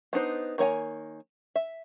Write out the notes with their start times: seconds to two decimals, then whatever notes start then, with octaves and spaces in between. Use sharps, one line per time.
0.13 B3 D4 D#4 C5
0.58 D#3 A#3 C#5 G#5 A#5
1.55 E5